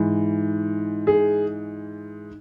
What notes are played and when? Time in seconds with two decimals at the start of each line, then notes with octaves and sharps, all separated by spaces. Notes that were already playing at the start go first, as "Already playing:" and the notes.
Already playing: G#2 E3
1.07 G#4